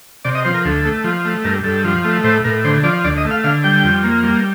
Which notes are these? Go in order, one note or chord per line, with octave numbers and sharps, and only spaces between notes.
C3 D5
D#5
F3 C5
A#4
D2 A4
A3
F3
A3
G2 A#4
G2 A4
F3
A3
A2 C5
A2 A#4
D3 C5
F3 D5
D2 D5
D#5
A3
F5
D3 F5
G3 G5
F2
A#3
G3